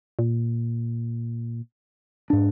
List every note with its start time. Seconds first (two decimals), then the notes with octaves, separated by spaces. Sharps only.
0.19 A#2
2.30 G#2 D4